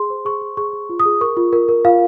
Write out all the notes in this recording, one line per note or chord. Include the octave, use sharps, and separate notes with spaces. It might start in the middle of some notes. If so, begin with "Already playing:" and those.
Already playing: G#4 C6
C5
G#4 C#6
G#4
G#4 C#6
G#4
F4
D#6
G#4
A#4 C#6
F4
A#4
A#4
F4 F5